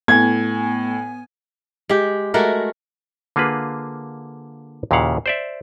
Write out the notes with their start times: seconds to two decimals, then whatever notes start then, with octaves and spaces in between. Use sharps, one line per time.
0.08 A2 B3 G#5 G#6
1.89 G#3 G4
2.34 G#3 A3 F#4 A#4
3.36 D3 A#3 F4 G#4 B4
4.91 D#2 A#2 C#3 E4 F5 F#5
5.26 C5 D5 E5